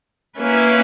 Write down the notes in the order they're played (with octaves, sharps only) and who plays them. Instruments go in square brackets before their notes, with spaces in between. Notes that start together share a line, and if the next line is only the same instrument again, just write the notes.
[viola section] A#3 C#4 E4 B4